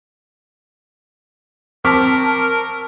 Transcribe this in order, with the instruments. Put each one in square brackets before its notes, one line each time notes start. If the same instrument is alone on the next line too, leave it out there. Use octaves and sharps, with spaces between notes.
[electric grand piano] C4 [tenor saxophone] A#4 [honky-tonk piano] A5 C#6 [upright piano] D6 F6 B6